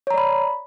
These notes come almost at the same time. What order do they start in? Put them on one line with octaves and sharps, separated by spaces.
C#5 A#5 D5 B5